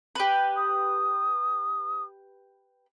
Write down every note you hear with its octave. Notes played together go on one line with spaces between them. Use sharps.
G4 B4
D#6